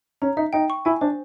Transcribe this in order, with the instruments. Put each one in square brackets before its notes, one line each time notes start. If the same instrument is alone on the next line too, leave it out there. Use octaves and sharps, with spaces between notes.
[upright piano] C#4 [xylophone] A#5
[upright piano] D#4 [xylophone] E5
[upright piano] D#4 [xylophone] G5
[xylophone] C#6
[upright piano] E4 [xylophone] G#5
[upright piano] D4 [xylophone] C5